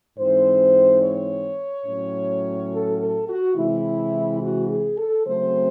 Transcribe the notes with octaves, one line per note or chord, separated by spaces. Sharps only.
G#2 E3 C4 C5
C#5
A2 F#3 C#4
A4
A4
F#4
C3 E3 G#3 E4
F#4
G#4
A4
C#3 F#3 A3 C4 C5